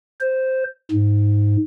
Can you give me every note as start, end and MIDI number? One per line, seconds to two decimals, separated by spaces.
0.21 0.64 72
0.91 1.56 44